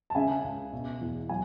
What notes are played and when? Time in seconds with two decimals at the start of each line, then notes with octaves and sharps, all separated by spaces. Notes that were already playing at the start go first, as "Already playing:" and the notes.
0.10 A5
0.15 C#3 E5 G#5
0.43 C#2
0.72 B2
1.01 E2
1.29 F#3 G#5